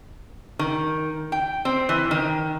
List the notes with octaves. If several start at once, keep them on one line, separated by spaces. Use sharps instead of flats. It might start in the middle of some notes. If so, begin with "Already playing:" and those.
D#3
G5
C4
E3
D#3